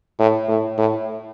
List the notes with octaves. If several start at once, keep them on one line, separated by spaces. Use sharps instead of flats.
A2
A2
A2